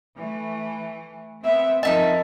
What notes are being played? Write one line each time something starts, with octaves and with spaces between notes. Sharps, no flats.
E3 A3
B3 C4 E5
F2 D#4 A#4 D#5 E5 A5